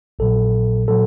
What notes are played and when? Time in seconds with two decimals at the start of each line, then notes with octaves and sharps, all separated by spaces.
0.19 A#1 A#2 F#3 A4
0.88 A#2 F#3 A4